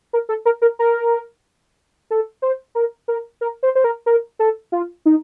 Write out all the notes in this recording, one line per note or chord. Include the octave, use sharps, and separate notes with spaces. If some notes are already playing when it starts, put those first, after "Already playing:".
A#4
A4
A#4
A#4
A#4
A4
C5
A#4
A#4
A#4
C5
C5
A#4
A#4
A4
F4
D#4